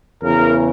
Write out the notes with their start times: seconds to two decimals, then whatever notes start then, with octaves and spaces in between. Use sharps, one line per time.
0.23 E2 C#3 E3 A#4